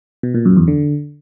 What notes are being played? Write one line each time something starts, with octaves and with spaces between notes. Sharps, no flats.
B2
A#2
F#2
E2
D3